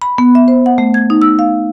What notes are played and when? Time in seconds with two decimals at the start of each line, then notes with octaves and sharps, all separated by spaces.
0.02 B5
0.18 B3
0.35 E5
0.48 C5
0.66 F#5
0.78 A3
0.94 G#6
1.10 D#4
1.22 E6
1.39 F5